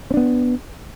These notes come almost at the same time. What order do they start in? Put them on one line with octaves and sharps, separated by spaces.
C4 D4 B3